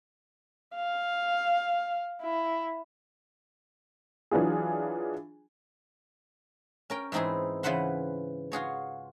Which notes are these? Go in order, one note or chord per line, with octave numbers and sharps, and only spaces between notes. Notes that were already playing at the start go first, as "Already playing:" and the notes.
F5
E4
E3 F#3 D4 F4 G#4
C#4 A#4 G5
G#2 E3 C4 D#4 E4 G#4
C#3 E3 B4 C5 F#5 C6
F4 F#4 G#4 C#5